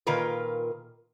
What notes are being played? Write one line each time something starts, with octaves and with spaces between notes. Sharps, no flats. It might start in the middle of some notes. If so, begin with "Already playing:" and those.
A#2 D#3 F4 A#4 B4